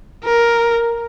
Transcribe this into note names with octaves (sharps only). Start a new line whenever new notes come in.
A#4